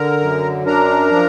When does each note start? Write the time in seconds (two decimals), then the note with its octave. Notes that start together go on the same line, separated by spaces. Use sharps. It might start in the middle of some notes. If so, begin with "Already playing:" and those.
Already playing: D3 A#4 A#5
0.20 F#2
0.66 D4 A#4 A#5
1.13 F3